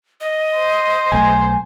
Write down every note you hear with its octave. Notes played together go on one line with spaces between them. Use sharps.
D#5
C5
B1 A3 G#5